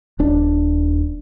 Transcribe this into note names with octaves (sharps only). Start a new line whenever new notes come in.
D#1 D4